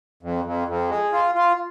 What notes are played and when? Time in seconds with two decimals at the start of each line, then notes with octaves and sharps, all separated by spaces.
0.23 F2
0.45 F2
0.68 F2
0.89 G#3
1.12 F4
1.35 F4